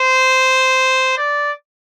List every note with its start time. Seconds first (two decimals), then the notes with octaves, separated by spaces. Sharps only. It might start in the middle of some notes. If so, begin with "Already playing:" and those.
Already playing: C5
1.18 D5